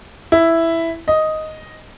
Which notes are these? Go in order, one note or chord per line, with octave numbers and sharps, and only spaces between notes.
E4
D#5